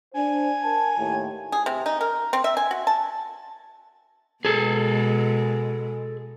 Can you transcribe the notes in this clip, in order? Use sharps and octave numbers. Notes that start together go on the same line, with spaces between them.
D4 C5 G#5
A#4 A5
D#2 A2
G#4
C3
D#4
A#4
C4
E5
G#5
F#4
A5
B2 G#3 G#4 A4